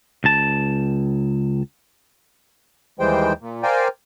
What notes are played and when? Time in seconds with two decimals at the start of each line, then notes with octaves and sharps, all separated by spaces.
0.24 C#2 A5
2.99 D#2 E3 G3 G#3 C5 G5
3.41 A#2
3.63 A#4 C5 D5 F5 G5 G#5